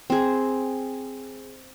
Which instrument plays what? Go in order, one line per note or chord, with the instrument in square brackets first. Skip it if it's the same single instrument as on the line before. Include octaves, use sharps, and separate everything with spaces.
[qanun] C4 G#4